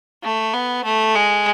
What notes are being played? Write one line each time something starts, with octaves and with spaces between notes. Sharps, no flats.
A3
B3
A3
G#3